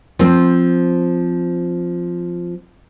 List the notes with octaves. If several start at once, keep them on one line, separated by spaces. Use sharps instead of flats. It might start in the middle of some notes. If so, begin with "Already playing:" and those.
F3 C4